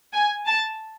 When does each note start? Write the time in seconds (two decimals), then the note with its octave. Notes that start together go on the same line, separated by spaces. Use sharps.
0.14 G#5
0.46 A5